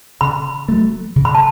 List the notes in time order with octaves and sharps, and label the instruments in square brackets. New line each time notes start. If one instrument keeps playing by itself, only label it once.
[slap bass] C#3 [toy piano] B5
[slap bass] F#3 A3
C#3
[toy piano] B5
A5